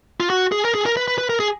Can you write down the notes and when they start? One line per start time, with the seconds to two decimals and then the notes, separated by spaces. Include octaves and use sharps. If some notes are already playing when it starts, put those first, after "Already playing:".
0.20 F4
0.30 F#4
0.52 G#4
0.65 A#4
0.75 G#4
0.86 A#4
0.97 B4
1.08 B4
1.18 B4
1.30 A#4
1.40 G#4